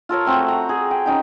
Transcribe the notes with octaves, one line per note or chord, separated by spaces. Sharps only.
F4 A4 A#4 C#5
A3 C4 F#4 A4
A#5
G#4
G5
C#4 D#4 G5